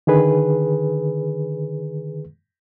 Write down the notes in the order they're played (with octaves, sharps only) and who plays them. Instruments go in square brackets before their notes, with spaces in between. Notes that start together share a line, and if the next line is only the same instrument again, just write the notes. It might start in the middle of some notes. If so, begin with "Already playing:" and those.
[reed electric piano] D3 D#3 G#4 B4